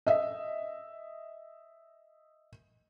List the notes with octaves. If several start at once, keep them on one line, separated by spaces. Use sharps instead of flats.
D#5 E5